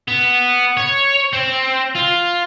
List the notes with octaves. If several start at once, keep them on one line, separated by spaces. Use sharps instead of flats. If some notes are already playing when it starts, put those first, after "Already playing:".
B3
C#5
C4
F4